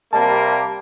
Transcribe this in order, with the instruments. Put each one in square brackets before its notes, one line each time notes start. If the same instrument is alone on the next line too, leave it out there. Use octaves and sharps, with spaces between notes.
[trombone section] C3 G3 A#3 [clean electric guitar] A5